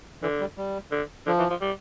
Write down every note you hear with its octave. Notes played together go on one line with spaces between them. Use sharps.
D3 E3
G3
G3
D3
D3 F3
E3
F3
G3